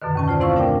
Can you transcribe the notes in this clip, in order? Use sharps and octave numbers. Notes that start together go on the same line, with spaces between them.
F#2 B2 D3 D#3
D#2 C#4 A5
F4 C5 D5
A3 C4 E4 C5 F5 C#6
B2 D4 A#4 D5 G5